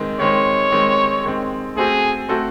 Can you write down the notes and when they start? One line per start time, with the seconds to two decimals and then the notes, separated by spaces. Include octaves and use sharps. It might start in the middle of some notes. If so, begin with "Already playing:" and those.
Already playing: D#3 G#3 C4
0.20 D#3 G#3 C4 C#5
0.72 D#3 G#3 C4
1.24 D#3 G#3 C4
1.76 A3 C4 F#4 G#4 A4 C5
2.29 A3 C4 F#4 A4 C5